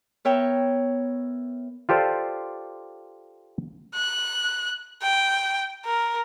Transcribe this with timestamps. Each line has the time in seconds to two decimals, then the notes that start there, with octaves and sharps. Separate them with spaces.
0.25 B3 A#4 C#5 E5 G5
1.89 F4 G4 A4 C5 D5
3.95 F#6
5.02 G5
5.85 A#4